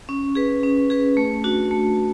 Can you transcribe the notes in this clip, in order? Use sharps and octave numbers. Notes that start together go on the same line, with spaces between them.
C#4
G#4 B4
C#4
G#4 B4
A3
D4 F#4
A3